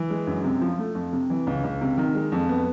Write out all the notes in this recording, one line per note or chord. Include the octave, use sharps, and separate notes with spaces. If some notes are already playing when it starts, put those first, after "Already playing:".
Already playing: E3
G#3
F#2
C3
F3
A3
F2
C3
E3
C#2
C#2
C3
D#3
G#3
F2
B3